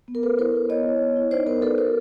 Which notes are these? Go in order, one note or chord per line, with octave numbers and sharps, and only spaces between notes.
B3
A#4
B3 A4 B4
E4 A#4 C5
E4
B3 C#5 D#5
E4
B3
E4
D#4 C5 D5
B3 A#4 C5
D#4 A4 B4
F#4 A#4 C5